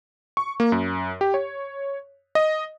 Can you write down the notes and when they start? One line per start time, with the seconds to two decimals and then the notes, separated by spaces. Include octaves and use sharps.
0.37 C#6
0.60 A#3
0.72 F#2
1.21 G4
1.34 C#5
2.35 D#5